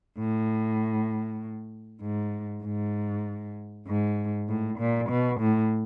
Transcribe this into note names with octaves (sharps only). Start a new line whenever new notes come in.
A2
G#2
G#2
G#2
A2
A#2
B2
A2